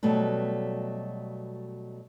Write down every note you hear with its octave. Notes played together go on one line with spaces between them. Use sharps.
B2 F#3 G3 A3 B4